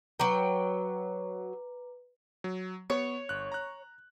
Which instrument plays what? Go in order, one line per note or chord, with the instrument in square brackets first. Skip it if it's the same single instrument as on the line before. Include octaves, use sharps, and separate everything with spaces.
[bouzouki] F#3 G5 [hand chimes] B4 [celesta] A#5 D6
[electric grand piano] F#3
[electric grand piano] B3 [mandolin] C#5
[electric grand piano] G1 F#6
A#5 F#6